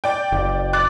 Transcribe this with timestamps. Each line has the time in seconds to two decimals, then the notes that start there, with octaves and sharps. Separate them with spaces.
0.04 D5 G5
0.32 F#1
0.73 D6 F#6 A6